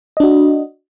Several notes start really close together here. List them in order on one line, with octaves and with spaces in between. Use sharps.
D#5 D4 F#4